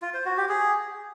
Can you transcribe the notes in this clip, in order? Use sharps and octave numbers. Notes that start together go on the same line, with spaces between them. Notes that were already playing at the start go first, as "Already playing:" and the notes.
F4
C5
F#4
G4
G#4